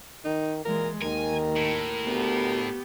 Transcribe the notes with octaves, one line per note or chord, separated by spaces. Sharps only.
D#3 D#4
A#2 E3 G#3 A#4
D#2 D#3 A#4 G#5
A2
D2 B3 G4